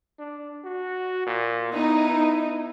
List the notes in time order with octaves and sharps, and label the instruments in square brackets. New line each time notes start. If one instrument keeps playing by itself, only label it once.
[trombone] D4
F#4
A#2
[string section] B3 D#4 [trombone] E4